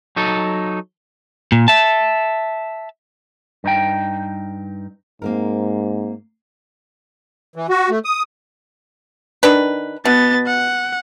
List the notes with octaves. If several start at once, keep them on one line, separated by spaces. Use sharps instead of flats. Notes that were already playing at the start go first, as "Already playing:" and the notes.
F#3 D#4 A4
A#2
E5 A5
G2 D#4 G5
G#2 A#3 C4 A#4
E3
F#4
A3
D#6
D#3 D4 B4
B2 B3 A6
F#5